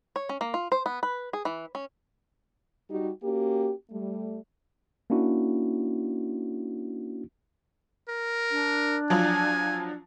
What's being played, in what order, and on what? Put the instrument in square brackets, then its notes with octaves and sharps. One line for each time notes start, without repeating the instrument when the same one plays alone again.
[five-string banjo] C#5
C#4
A#3
F4
C5
B3
B4
G#4
E3
C#4
[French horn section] G3 D#4 F#4 G4
A#3 C#4 F#4 G4
G3 A3
[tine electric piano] A#3 C#4 D4 E4 F#4
[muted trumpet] A#4
[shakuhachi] D4
[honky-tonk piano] F3 F#3 F4 [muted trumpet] G#5